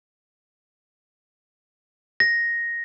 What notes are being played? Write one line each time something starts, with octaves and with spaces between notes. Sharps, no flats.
A#6